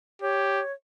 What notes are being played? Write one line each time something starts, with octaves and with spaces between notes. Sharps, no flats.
G4 C#5